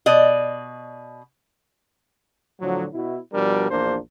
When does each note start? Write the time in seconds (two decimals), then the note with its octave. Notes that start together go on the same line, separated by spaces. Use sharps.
0.06 B2 D5 D#5
2.61 A2 D3 F3 F#3
2.94 B2 E4
3.34 B2 F3 G3 D4 A#4
3.71 A#1 E2 A#3 D4 C5